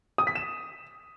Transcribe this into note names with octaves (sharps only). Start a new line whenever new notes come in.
D#6
B6
E7